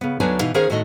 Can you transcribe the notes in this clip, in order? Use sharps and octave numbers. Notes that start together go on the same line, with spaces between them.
C#3 B3
D2 F#3 D4 D#4 B4 G#5
B2 E3 D#4 F5
D#3 C#4 G#4 A#4 C5 F5
A2 D#3 A3 F#4 D#5